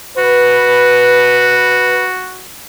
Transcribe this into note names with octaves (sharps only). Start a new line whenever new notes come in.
F#4 B4